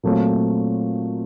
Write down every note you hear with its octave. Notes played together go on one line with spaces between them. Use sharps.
A#2 F#3 A3 C4 F4